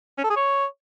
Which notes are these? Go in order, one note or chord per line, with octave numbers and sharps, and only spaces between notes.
C#4
A4
G#4
C#5